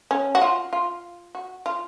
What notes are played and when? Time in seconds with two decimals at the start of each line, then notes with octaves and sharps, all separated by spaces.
0.11 C#4
0.35 F#4
0.42 F4
0.73 F4
1.35 F#4
1.66 F4